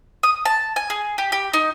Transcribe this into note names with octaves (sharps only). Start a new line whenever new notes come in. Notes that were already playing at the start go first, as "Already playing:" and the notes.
D#6
A5
G#5
G#4
G4
G4
D#4